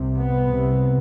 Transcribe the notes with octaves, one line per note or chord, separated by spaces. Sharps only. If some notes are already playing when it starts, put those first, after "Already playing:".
Already playing: C2 C3
B3
C2 C3